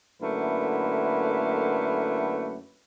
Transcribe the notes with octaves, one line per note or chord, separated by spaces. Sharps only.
F#2 D3 A3 A#3 E4 B4